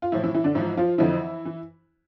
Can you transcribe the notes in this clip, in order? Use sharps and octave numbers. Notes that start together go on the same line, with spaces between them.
F4
A2 E3 F3 E4
E3 E4
E3 E4
D3 D4
G#2 E3 F3 E4
F3 F4
F2 D3 E3 F3 E4
E3